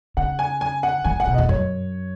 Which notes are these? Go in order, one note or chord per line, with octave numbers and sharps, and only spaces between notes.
C#3 F#5
G#5
G#5
F#5
D#3 G#5
D#3 F#5
B2
E2 D#5
F#2 C#5